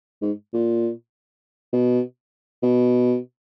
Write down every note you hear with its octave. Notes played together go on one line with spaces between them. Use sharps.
G#2
A#2
B2
B2